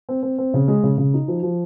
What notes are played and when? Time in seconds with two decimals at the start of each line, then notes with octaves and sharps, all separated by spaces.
0.09 C4
0.23 C4
0.38 C4
0.54 C#3
0.68 G#3
0.83 C#3
0.98 C#3
1.14 D#4
1.28 F3
1.43 F3